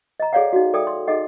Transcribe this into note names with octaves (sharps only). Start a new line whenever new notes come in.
D#5 A#5
G#4 A4 C#5 D5 F5 F#5
D#4 F#4
A4 D5 E5 G5 D#6
C6
D#4 G#4 A4 D#5 F#5